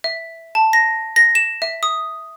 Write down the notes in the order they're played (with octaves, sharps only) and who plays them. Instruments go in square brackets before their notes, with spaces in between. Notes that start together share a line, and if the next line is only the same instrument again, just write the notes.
[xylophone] E5
A5
A#6
A#6
E7
E5
D#6